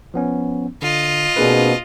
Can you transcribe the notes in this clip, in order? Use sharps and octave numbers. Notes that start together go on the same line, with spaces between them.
F3 B3 C#4
D3 F4 D#5
B2 A#3 C4 D4 G#4 B4